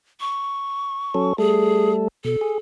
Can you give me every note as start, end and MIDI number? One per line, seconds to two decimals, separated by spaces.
0.21 1.37 85
1.14 1.33 54
1.14 1.33 61
1.14 1.33 69
1.38 2.08 55
1.38 2.08 57
1.38 1.92 68
1.38 2.08 69
2.25 2.36 47
2.25 2.58 69
2.41 2.58 68